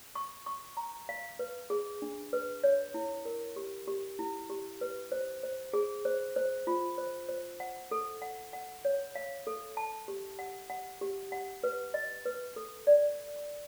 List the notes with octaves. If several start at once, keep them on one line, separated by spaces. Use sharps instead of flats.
C#6
C#6
A#5
F5
B4
G#4
D4
B4
C#5
E4
A#4
G4
G4
E4
G4
B4
C5
C5
G#4
C5
C5
F4
C5
C5
F#5
A4
F#5
F#5
C#5
F5
A4
A5
G4
F#5
F#5
G4
F#5
B4
D#5
B4
A4
D5